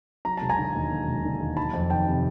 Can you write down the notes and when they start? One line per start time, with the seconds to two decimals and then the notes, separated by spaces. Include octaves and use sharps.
0.25 F#3 A#5
0.37 E1 A5
0.49 G#5 A#5
0.58 D3
0.75 D#2
0.91 F#3
1.07 E1
1.25 D3
1.41 D#2
1.57 F#3 A5 B5
1.73 F2
1.90 D#3 G5 A5
2.07 C3